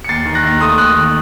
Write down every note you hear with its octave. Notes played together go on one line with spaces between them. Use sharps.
C#7
D#2 A6 C7
D#3
F#6 A#6
D#2
A3 C6 D#6
D#2 D#6 F#6
D#3